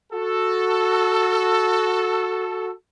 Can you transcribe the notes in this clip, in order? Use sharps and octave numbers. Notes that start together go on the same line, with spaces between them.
F#4 A4